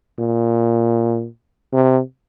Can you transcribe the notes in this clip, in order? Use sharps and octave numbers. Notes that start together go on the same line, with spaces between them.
A#2
C3